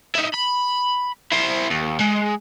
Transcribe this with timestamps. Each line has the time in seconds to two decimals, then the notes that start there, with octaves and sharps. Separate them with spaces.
0.15 D#4 E4
0.34 B5
1.32 E4 C5
1.70 D#2
2.00 G#3